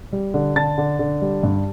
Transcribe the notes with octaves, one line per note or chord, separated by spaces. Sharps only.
G3
D3
D3 A5 A6
D3
D3
G3
G2